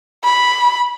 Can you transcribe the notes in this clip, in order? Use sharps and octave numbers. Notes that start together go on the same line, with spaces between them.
B5